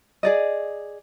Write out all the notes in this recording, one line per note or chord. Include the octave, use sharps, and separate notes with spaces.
G#4 D5 D#5